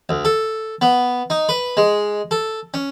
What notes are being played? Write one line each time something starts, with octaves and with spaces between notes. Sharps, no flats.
D2
A4
B3
D#4
B4
G#3
A4
C#4